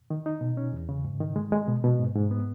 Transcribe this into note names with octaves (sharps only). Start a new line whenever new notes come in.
D#3
D#4
B2
C#4
E2
C#3
G#2
D#3
G#3
G#3
B2
B2
G#2
G#2
B3